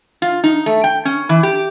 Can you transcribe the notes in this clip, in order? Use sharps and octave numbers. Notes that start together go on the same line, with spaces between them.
F4
D#4
A3
G5
C#4
E3
G4